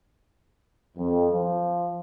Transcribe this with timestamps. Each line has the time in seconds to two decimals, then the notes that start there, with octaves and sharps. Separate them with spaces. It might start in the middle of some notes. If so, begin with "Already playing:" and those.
0.97 F2
1.30 F3